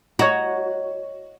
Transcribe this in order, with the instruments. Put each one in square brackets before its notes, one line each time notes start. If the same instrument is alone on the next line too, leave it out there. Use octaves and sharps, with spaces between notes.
[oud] F#4 [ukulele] C#5 D#5 A#5